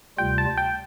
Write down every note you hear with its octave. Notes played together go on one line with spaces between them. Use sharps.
D2 C3 G3 F4 G5
A5
G5